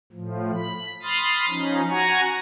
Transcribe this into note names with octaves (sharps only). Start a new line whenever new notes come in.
A2 F3
B5
B5 C6 D#6 F6 A6
F3 C#4 D#4
F#4 F#5 G#5 A#5 C#6